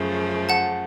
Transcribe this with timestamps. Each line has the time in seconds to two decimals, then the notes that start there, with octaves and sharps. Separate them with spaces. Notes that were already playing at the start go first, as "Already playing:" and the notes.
Already playing: F#2 C#3 F3 A3
0.49 F#5 A5